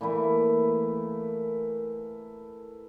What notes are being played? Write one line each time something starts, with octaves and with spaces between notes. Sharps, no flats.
E3 A3 A#3 E4